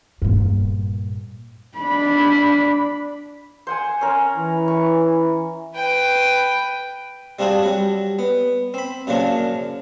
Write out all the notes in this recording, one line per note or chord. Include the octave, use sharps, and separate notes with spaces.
G2 A#2
D4 B5
C5 F#5 G#5
C#4 A#4
E3
C#6
B4 G5
G3 C4 D4 F4 F#4 G#4
F#3 G3
B3
C4 B5
F#2 A#2 C#3 F3 F#3 D4